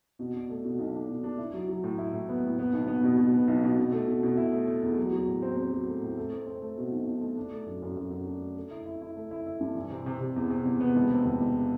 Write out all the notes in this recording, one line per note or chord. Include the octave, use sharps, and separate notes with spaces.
B2
D4
A3
B2
B1
D4
B1
D4
E4
F#3
F#3
A2
E4
A2
B3
A2
B3
B1
B3
B2
B2
B3
B1
B2
B2
A3
B2
B2
E4
A3
A3
E2
F#3
F#3
A2
C4
C4
F#3
A3
A2
A3
C4
C4
A3
B2
B1
B1
A3
D4
A3
F#2
F#2
F#2
F#2
D4
A3
A3
E4
E4
E4
A3
E4
E4
G2
E3
C3
C3
C3
E2
C3
E2
B3
E1
C3
E1
E1